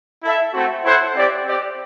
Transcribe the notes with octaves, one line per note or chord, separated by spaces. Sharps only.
E4 A4 E5
A3 C4 F#4
E4 A4 C5 F#5
C4 G4 D5
C4 G4 D5